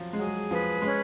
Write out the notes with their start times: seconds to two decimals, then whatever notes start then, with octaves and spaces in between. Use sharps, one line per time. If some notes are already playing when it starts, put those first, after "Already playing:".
Already playing: F3 F#3
0.13 G#3
0.19 F#3 G#4
0.51 F3 B4
0.82 G#3 C#4